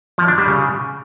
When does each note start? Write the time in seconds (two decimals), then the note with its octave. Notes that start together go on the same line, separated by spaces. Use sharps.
0.18 F3
0.28 D4
0.38 G3
0.48 C#3